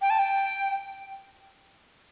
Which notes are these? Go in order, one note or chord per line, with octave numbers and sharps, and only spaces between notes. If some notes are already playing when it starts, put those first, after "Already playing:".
G5
A5
G5